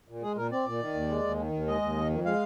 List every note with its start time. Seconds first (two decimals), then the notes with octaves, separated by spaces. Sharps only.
0.08 A#2
0.22 G#3 G#4
0.36 A#2 A#4
0.51 C4 D5
0.66 A#2
0.80 D#3
0.94 D#2
1.09 G#3
1.23 D#2
1.37 D#3
1.52 D#2
1.67 G#3 D#5
1.81 D#2
1.96 D#3
2.10 F2
2.25 G#3 F5